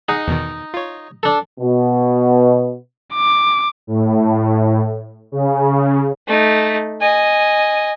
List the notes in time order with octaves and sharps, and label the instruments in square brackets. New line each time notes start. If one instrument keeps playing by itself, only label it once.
[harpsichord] D#4 [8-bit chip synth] G#4 D#5 F#5
[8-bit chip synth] E2 B2 D#3
F4 C#5
[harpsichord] D4 A4
[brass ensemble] B2
[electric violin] D6
[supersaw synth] A2
C#3
[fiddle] A3 D#4
D#5 G#5